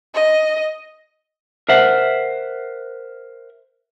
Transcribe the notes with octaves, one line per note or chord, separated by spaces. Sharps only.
D#5
A#4 C5 E5 F#5